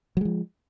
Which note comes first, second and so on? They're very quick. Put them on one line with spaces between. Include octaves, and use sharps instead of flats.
F#3 G#3 F3